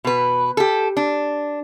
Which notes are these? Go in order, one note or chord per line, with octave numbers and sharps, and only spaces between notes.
B2 B4
G4 A4
D4